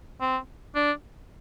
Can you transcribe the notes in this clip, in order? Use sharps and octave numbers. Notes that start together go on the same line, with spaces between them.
C4
D4